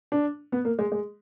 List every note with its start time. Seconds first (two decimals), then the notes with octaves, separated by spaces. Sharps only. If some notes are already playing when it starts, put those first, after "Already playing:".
0.12 D4
0.52 B3
0.65 A#3
0.79 G#3
0.92 G#3